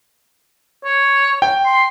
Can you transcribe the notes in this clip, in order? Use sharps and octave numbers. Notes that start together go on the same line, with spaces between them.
C#5
G5
C6